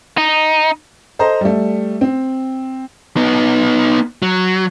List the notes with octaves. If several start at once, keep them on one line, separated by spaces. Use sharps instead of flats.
D#4
A4 C5 D#5 A#5
G3 A3
C4
B3 D#4
F#3